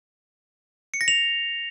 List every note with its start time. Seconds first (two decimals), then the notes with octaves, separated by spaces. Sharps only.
0.94 C#7
1.01 A#6
1.08 F7